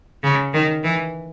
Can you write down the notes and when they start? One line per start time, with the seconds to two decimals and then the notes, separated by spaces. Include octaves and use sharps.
0.24 C#3
0.54 D#3
0.83 E3